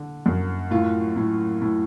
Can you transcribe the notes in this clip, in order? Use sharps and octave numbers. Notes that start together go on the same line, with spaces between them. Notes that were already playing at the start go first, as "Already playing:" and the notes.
Already playing: D3
F#2
A2 F4
A2
A2